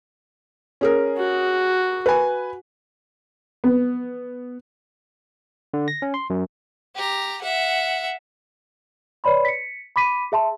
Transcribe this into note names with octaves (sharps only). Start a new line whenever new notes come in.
C#4 G#4 A#4
F#4
B4 G#5
B3
D3
A#6
C#4
C6
F#2
G4 A#5
E5 F#5
B4 C#5 D5 B5 C6
B6 C#7
B5 D6 B6 D#7
G#4 E5 A5 C6